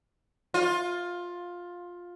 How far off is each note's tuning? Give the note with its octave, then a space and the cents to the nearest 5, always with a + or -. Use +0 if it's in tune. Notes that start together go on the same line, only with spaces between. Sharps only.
F4 +15